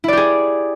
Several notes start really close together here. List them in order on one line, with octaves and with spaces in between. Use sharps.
E4 D5 G4 G#4